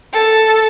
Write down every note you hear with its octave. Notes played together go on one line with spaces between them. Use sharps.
A4